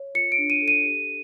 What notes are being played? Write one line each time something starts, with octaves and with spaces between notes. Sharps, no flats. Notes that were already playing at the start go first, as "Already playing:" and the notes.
Already playing: C#5
F4 C#7
D7
D4
D#7
A4
D#7
G4